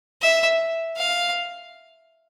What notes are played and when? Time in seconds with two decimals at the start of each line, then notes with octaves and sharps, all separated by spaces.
0.22 E5
0.97 F5